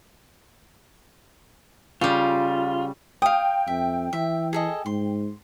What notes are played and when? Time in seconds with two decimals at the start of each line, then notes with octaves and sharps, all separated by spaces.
2.01 C#3 G3 F4
3.22 F5 G5 D#6
3.67 F2 E5
4.13 E3 E5
4.53 G#4 A4 D#5
4.86 G#2 C6